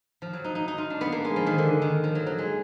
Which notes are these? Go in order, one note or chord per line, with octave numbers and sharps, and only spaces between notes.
F3
F#3
D#4
D#4
D#4
F4
D4
B3
A#3
G#3
F3
D#3
D3
D#3
F3
F#3
F#3
G#3